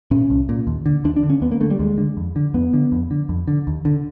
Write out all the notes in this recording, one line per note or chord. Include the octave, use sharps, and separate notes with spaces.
A#2 C#4
C2
A#2
D#2
D3
D#2 D4
D4
D3
C#4
D#2 B3
A#3
D3 A3
G3
D#2 G#3
D3
F2
D3
F2 B3
D3
F2
D3
F2
D3
D#2
D3